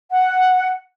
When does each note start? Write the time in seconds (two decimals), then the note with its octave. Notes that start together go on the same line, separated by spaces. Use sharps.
0.11 F#5